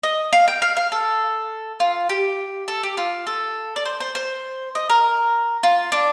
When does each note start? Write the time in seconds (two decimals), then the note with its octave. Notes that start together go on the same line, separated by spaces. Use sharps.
0.03 D#5
0.33 F5
0.48 G5
0.62 F5
0.77 F5
0.92 A4
1.80 F4
2.09 G4
2.68 A4
2.83 G4
2.97 F4
3.27 A4
3.76 D5
3.86 C5
4.00 C5
4.15 C5
4.75 D#5
4.90 A#4
5.63 F4
5.92 D4